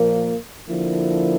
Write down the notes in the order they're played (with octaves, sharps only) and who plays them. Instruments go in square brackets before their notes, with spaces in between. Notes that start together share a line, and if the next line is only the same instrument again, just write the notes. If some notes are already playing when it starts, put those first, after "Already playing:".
Already playing: [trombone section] A#2 F3 A#3
D3 F3 A#3 E4